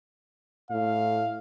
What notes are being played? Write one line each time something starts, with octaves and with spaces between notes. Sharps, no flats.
A2 F5